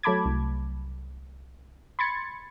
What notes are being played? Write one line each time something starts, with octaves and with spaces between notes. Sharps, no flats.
F#3 A3 A5 B5 D6 G#6
C2
B5 C6 G#6 A6 C#7